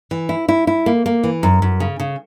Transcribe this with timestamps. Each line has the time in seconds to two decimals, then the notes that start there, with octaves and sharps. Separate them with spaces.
0.11 E3
0.29 E4
0.48 E4
0.67 E4
0.86 A#3
1.06 A#3
1.24 E3
1.43 F#2
1.62 F#2
1.80 C#3
2.00 C#3